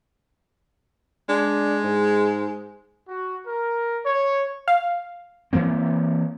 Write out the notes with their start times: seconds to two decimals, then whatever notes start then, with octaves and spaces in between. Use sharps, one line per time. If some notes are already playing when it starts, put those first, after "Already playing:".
1.29 G#3 D4
1.84 G#2
3.08 F#4
3.46 A#4
4.04 C#5
4.68 F5
5.53 E3 F3 A#3 C4